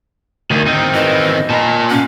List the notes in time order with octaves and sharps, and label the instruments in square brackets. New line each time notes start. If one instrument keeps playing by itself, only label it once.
[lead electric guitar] D2 [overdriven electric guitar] D#3
[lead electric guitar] D#3 C4 [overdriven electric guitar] D#4
[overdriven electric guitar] E3 [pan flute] D#5
[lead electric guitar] A#2 [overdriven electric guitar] A5 B5
[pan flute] C#4 [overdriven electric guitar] F5 F#5